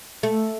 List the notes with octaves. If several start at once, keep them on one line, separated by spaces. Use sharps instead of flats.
A3